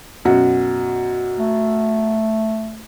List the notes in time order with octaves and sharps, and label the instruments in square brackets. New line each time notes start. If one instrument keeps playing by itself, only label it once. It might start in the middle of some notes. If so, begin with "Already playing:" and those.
[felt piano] F#2 B2 F#4
[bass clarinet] A3